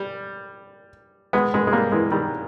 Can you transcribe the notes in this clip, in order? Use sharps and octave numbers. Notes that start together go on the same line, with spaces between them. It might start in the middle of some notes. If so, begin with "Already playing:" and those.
Already playing: G3
G#3 B3
G#3 B3
G#3
G3 A#3
E3 G#3
D#3 G3